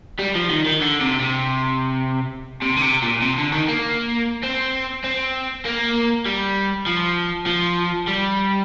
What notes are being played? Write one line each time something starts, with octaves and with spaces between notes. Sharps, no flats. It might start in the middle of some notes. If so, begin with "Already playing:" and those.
G3
F3
D#3
D#3
D3
C3
C3
C3
D3
C3
A#2
C3
D3
D#3
A#3
C4
C4
A#3
G3
F3
F3
G3